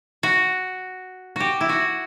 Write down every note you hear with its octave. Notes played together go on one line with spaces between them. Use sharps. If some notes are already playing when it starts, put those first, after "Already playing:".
F#4
F#4 G4
E4
F#4